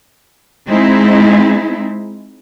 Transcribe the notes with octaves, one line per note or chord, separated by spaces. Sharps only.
G#3 C4 D#4 E4